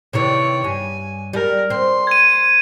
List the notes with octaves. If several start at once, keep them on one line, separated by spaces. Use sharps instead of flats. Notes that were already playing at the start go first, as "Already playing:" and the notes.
C3 D#3 E3 C#5 D5
G2 G#5
G3 A#4
C4 C6
G#6 D#7